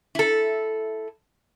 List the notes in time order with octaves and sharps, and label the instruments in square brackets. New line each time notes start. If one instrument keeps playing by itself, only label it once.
[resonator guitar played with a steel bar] E4 A4